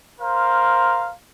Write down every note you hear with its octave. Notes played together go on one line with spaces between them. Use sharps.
A#4 C5 F5